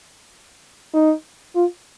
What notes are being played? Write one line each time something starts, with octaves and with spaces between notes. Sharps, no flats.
D#4
F4